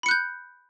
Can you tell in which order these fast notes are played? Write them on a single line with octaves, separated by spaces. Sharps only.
B5 C#7 F#6 G6